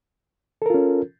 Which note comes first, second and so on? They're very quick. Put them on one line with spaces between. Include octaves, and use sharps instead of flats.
A4 A#4 F4 C#4